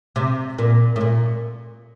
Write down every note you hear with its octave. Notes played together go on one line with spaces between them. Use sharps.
C3
A#2
A2
A#2